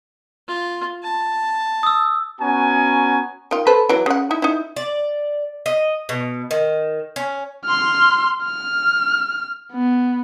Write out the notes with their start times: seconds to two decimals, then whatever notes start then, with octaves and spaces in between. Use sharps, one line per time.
0.48 F4
1.04 A5
1.83 D#6 E6
2.40 B3 C#4 F#4 G#5 A#5
3.51 D#3 F4
3.67 A4 B4 C5
3.89 E3 F#3
4.06 C#3 F#5
4.31 D#4 E4
4.42 D#4 E4
4.76 D5
5.66 D#5
6.09 B2
6.51 D#3
7.16 C#4
7.66 C6 F6
8.44 F6
9.72 B3